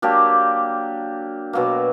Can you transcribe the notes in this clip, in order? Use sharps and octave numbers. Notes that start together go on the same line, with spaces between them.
F#3 A#3 D4 G4
B2 F#3 A#3